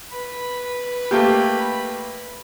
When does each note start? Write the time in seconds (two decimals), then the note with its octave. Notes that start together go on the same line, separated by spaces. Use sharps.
0.10 B4 B5
1.11 A3 A#3 G4